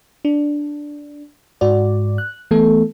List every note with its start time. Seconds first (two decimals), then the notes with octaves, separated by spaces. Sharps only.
0.25 D4
1.61 G#2 F#4 D5
2.18 F#6
2.51 E3 A3 B3 E4 A4